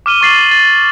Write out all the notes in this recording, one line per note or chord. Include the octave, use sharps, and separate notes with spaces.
D6 F6 D#7 G7
C#6 D6 A6 C7 E7 F#7
A6 C7